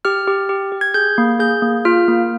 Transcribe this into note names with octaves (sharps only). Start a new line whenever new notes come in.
G4 F6
G4
G4
G4
G#6
G#4 G6
A#3
G#4 G6
A#3
F4 F6
A#3